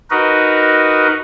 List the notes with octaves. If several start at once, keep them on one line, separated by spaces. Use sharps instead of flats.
D#4 F#4 A#4 B4 D#5